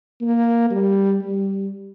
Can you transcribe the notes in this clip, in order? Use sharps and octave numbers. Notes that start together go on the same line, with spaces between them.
A#3
G3
G3